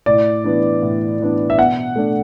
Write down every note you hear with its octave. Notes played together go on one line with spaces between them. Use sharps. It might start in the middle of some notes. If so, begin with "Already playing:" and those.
A2 D5
E3 B3 D4
A2
E3 B3 D4
E5
B2 F#5
A3 D4